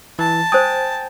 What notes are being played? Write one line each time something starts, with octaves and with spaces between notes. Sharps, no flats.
E3 A5
C5 G5 G#5 D#6